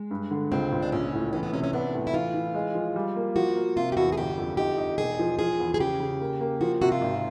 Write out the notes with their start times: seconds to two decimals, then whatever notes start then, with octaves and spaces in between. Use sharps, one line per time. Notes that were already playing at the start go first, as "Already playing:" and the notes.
Already playing: G#3
0.11 G2
0.31 D3
0.51 C#2 C4
0.72 C#2
0.83 D4
0.92 A#1 C#4
1.13 A2
1.33 E3 C#4
1.43 B3
1.53 C3 C#4
1.64 C#4
1.73 B3 D4
1.94 A2
2.07 E4
2.13 E3 F4
2.34 E3
2.54 G#3
2.75 F3
2.96 G3
3.16 A#3
3.36 F3 F#4
3.56 A#3
3.76 C3 F4
3.92 G4
3.97 E2 F#4
4.12 G#4
4.18 G1 G4
4.37 F2
4.57 D#4 G4
4.78 D#4
4.98 E1 G#4
5.19 F3
5.39 F3 G#4
5.60 E2
5.74 G#4
5.80 C#3 G4
6.00 C#3
6.21 A#3
6.41 A#3
6.61 F3 F#4
6.81 C3 F#4
6.92 F4
7.01 G#1